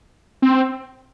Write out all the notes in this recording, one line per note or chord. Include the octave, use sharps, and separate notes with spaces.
C4